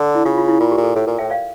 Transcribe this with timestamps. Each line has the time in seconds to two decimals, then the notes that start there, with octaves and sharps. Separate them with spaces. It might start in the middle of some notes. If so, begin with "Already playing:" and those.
Already playing: D3
0.15 E4
0.25 C#3 F4
0.38 F4
0.48 E4
0.60 A#2 F4
0.72 G4
0.77 A#2
0.84 A4
0.96 A2 A4
1.07 A#2 A#4
1.18 A2 E5 G5
1.30 D5 F5